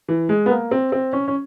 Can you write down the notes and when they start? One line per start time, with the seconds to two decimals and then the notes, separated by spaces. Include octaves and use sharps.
0.08 E3
0.29 G#3
0.46 B3
0.51 A#3
0.71 C4
0.92 C4
1.13 C#4
1.28 C#4